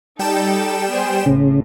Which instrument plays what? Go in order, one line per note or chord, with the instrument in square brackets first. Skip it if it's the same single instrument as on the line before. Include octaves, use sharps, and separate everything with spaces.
[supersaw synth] G3 G5 E7 [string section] D#4 A4
[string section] B3 G#4 C5
[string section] A1 A2 [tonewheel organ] C#3